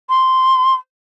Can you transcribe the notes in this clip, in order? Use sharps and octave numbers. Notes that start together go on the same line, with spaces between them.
C6